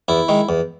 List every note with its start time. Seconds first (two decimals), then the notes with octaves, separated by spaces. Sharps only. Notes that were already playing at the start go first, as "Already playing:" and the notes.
0.08 E2 E4
0.29 D#3 G#3
0.49 E2